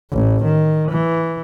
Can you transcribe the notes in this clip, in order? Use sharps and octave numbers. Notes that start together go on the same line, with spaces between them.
A1
D#3
E3